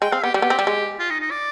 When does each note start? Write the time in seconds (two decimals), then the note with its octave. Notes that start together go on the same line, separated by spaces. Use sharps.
0.02 G#3 G5
0.12 C4 F5
0.23 B3 G4
0.34 G3 G4
0.42 B3
0.50 C4
0.59 G3
0.67 G#3
0.99 F4
1.10 D#4
1.21 D#4
1.31 D5